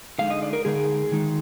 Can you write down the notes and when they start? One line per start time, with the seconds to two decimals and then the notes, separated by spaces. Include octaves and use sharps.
0.18 D3 G#3 D#4 F5
0.30 D#5
0.43 D5
0.53 A#4
0.65 D3 G#3 D#4 G#4
1.12 D#3 G#3 D#4